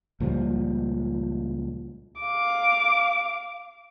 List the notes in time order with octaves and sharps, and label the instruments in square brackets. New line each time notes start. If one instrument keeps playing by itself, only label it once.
[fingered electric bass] C#2 A#2 F3 G3
[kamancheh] F5 D6